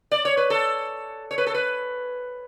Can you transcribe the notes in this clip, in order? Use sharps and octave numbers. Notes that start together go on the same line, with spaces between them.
D5
C#5
B4
A4
C#5
B4
A4
B4